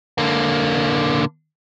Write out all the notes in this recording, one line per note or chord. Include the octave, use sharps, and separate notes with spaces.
D3 A#3